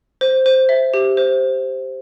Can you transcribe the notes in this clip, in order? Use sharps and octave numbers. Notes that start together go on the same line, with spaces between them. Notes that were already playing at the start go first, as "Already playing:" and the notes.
C5
C5
E5
G4
C5